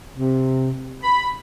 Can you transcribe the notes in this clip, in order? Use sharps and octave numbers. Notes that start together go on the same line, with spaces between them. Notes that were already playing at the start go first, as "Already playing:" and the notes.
C3
B5